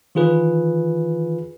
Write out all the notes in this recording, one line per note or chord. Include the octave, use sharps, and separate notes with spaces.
D#3 E3 F4 G#4 B4